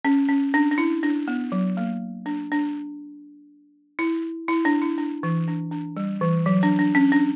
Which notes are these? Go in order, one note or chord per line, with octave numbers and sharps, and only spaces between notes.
C#4
C#4
D4
D4
E4
D4
B3
F#3
A#3
D4
D4
E4
E4
D4
E4
D4
E3
D4
D4
G3
E3
F#3
D4
D4
C#4
D4